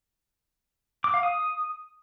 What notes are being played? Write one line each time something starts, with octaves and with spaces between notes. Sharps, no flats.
D6
F5
D#6